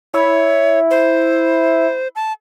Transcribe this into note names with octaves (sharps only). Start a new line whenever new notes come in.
E4 C#5
C5
A5